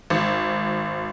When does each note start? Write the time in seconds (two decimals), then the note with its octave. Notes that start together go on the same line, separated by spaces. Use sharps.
0.10 G#1